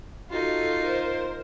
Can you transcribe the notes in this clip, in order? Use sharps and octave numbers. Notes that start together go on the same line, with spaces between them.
D#4 F4 F#4 A4
A#4 C5